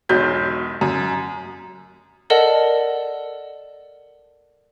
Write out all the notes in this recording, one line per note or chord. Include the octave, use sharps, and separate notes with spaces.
E1 B1 F#3 G6
F#2
A4 A#4 D5 D#5 F#5 A5